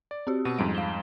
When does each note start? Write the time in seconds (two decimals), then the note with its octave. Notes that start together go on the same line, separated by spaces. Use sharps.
0.11 D5
0.27 C4 F#4 G4
0.45 B2 E6 D#7
0.59 F2 G#2 G3 D7
0.75 F5 E7 G7